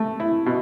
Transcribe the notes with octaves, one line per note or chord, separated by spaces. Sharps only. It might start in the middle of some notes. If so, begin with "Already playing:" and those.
Already playing: A3
E4
B2